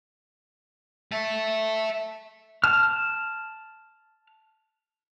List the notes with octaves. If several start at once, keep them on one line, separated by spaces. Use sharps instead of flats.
E5 A5
A5 F6